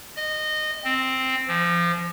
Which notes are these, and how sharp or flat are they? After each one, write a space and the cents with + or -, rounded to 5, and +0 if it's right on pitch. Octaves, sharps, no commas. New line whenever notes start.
D#5 -20
C4 +0
F3 -25